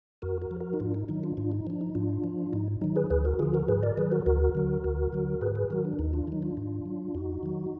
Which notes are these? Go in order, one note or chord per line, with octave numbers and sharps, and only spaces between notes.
F2 F#4 A#4
F#4 A#4
F3
F#4 A#4
D#4
G#2 D4 F4
D#4
D#3 F#3 D#4
D4 F4
G#2 D4 F4
D#4
F3 D4
D#4
G#2 D4 F4
F3
G#2 D#4
D#3 F#3 D#4
G#4 B4
D2 G#4 B4
F#4 A#4
D3 F3 F4 G#4
F#4 A#4
G#2 G#4 B4
A#4 D5
D#3 F#3 G#4 B4
F#4 A#4
D2 F#4 A#4
D3 F#3
D2
D3 F#3
G#2 G#4 B4
G#4 B4
D#3 F#3 F#4 A#4
D4
D#2 D#4
D4 F4
D#3 F#3 D#4
D4 F4
G#2
F#3
F2 D#4 F#4
D#3 F#3